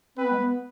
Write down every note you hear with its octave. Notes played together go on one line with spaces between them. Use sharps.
C4 B4
B3
G#3
B3